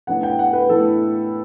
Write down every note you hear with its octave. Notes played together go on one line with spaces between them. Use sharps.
A2 E3 B3 D4 F#5
G5
F#5
B4
A2 E3 B3 D4 A4